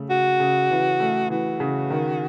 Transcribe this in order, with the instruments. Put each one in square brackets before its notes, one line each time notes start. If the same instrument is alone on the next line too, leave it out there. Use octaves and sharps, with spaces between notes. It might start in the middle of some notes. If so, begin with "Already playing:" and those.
Already playing: [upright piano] C#3 A3
[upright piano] C#3 [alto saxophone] F#4
[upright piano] C#3
E3
A3
[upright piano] E3 [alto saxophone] F#4
[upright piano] C#3
D#3